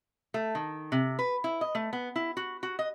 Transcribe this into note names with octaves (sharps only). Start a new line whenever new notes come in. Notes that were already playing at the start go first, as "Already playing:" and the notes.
A3
D#3
C3
B4
E4
D#5
A3
B3
E4
F#4
F#4
D#5